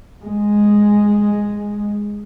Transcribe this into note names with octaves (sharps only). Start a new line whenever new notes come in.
G#3